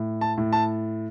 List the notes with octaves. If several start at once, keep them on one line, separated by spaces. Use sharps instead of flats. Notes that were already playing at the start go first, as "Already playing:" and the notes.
Already playing: A2
A5
A2
A5